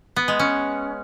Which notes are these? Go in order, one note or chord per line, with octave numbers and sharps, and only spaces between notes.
B3
G#3
C#4